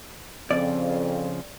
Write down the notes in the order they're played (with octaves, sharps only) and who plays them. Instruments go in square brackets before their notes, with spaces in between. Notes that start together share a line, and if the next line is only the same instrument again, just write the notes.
[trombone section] F2 [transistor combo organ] C#3 F3 [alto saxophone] C4 [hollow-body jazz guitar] D5